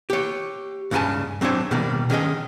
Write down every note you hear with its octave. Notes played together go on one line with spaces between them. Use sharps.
G4 C#5
C#2 G2 C#3 F#5 G#5 A5
F#3 C4 D4 C5 C#5
B2 D#3 G3 A#3
D#3 C#4 G#4 D#5